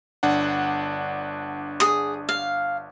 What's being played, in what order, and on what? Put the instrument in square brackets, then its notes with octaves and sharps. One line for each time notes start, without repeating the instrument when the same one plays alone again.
[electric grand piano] G1 D4 F#5
[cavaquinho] G#4 D#6
F5